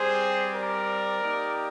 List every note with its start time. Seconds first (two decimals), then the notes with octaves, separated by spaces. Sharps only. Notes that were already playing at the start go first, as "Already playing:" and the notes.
Already playing: G3 C4 G4 G#4 C5
0.54 A#4 D5
1.23 A#3 D#4 G4